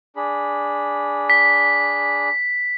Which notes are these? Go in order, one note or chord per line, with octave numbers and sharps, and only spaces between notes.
D4 G#4 B5
B6